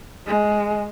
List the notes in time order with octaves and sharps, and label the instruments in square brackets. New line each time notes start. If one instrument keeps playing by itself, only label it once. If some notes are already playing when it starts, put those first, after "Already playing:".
[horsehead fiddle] G#3